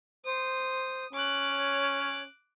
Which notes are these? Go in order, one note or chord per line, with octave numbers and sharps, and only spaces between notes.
C5 D#6
C#4 D6 F#6
C#5